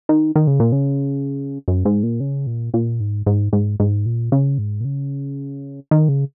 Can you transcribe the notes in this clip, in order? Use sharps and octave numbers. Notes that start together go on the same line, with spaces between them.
D#3
D#3
C#3
A#2
C#3
F#2
G#2
A#2
C#3
A#2
A#2
G#2
G#2
G#2
G#2
A#2
C#3
G#2
A#2
C#3
D#3
C#3